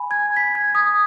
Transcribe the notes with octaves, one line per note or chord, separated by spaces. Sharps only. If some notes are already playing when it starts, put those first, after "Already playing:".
Already playing: G#5 B5
G#6
B6
G#6
D#6